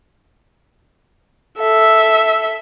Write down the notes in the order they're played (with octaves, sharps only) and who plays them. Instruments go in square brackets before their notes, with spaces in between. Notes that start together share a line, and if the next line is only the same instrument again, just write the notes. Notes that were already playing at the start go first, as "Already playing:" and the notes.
[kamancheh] A4 E5